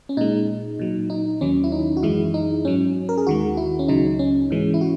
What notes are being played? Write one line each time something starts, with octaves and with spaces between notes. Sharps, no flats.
C#4
A#2 G#3 D#4
A#2 F#3
D#4
D#2 D#3 F#3 C#4
E4
D#4
F#4
F#2 E3 G#3 E4
D#4
G#2 F#3 C#4
A#4
G#4
D#2 D#3 G#3 F#4
E4
C#4
C#2 C#3 F#3 D#4
C#4
G#2 E3 G#3
E4
F#4